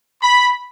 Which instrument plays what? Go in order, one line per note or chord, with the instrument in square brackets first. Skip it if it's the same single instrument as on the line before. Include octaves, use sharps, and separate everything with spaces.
[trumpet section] B5